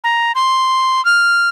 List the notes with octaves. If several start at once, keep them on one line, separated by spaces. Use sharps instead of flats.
A#5
C6
F6